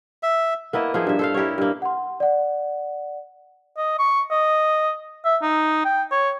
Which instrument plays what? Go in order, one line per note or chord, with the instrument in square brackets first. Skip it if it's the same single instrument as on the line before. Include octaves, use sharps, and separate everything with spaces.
[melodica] E5
[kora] A#3 B3 E4 D#5
F3 D#4 E4 G#4
G2 E5
A4 C5 F5
E4 G4 A#4 C#5
G2 A#3
[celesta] F#5 C6
D5 F#5
[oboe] D#5
C#6
D#5
E5
D#4
G5
C#5